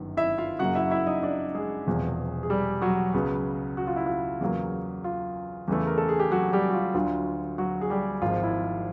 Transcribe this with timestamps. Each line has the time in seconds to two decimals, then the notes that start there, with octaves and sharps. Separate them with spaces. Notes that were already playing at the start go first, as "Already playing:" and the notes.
Already playing: G1 F#2 D#3
0.17 E4 E5
0.38 F4 F5
0.59 F#2 C#3 F#3 A#3 F#4 F#5
0.75 E4 E5
0.91 E4 E5
1.07 D#4 D#5
1.23 D4 D5
1.55 G#3 G#4
1.87 E1 E2 C3 F3
2.43 G#4
2.50 G3 G4
2.82 F#3 F#4
3.14 C#2 C#3 F#3 B3
3.77 F#4
3.87 F4
3.96 E4
4.06 F4
4.41 E2 C#3 F#3 A#3
5.04 F4
5.68 E2 C#3 E3 A3
5.87 A#4
5.98 A4
6.09 G#4
6.20 G4
6.31 F#3 F#4
6.53 G3 G4
6.69 F#4
6.73 F4
6.94 D2 D3 F#3 F4
7.58 F#3 F#4
7.81 G#4
7.90 G3 G4
8.22 G#1 G#2 F3 F4
8.43 E4